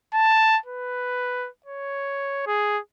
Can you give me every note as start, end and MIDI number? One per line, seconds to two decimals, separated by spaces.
0.14 0.58 81
0.66 1.48 71
1.66 2.43 73
2.47 2.79 68